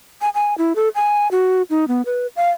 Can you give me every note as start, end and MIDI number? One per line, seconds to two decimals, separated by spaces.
0.21 0.29 80
0.35 0.57 80
0.58 0.73 64
0.76 0.89 69
0.95 1.30 80
1.31 1.62 66
1.70 1.88 63
1.88 2.02 59
2.06 2.27 71
2.36 2.50 77